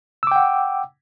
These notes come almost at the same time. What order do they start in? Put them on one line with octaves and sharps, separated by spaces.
E6 D6 G5 F#5